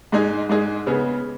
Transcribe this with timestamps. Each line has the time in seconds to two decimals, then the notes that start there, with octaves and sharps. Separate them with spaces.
0.12 G#2 G#3 D#4 G#4
0.49 G#2 G#3 D#4 G#4
0.87 C#3 B3 G#4